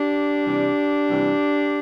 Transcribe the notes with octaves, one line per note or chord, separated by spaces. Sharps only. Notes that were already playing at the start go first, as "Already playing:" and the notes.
Already playing: D4 G4
C3 E3 G3
C3 E3 G3